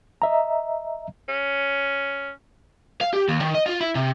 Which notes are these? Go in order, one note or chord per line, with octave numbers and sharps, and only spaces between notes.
D#5 E5 A#5
C#4
F5
G4
D#2
D#3
D#5
F4
E4
C3